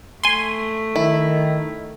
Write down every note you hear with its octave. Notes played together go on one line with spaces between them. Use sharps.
A3 G#5 C6
D#3 E4